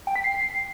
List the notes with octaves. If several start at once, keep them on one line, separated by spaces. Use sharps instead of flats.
G5
B6
C7